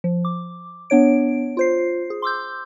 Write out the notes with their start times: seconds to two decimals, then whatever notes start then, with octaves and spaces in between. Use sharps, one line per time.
0.04 F3
0.25 D6
0.90 B3 D4 C#5 D7
1.57 F4 C5 C7
2.10 G#4
2.22 C6 D6 E6 G6